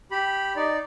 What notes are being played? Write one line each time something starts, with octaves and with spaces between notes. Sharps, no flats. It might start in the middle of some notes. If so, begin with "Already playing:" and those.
G4 B5
D#4 D5